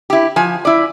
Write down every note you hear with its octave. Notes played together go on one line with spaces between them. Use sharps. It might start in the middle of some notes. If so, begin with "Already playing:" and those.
E4 G4
F3 G#5
E4 D5